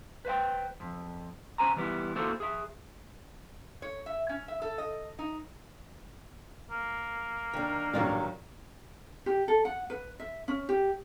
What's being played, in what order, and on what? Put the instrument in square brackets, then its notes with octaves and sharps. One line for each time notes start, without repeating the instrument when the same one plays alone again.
[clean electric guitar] B4 C5 E5 G5
F2
C#4 C5 G#5 A#5
E3 G3 B3 E4
A#3 E4 F#4 A4 C5
G#4 E5
[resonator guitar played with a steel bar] C#5
E5
C#4
E5
A4
D#5
D#4
[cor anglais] A#3
[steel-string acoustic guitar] D#3 D4
[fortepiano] A1 G2 D5 [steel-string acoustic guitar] A#2 D#3 F#3
[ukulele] G4
A4
F#5
B4
E5
C#4
G4